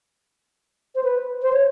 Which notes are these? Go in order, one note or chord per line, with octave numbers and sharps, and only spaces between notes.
C5
B4
C5
C#5